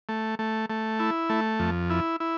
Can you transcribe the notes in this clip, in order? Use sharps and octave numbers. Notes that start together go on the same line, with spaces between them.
A3
A3
A3
E4
A3
F2
E4
E4